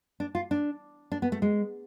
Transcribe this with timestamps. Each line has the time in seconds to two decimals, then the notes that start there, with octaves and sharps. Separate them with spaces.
0.20 D4
0.35 F4
0.51 D4
1.12 D4
1.22 B3
1.32 A3
1.42 G#3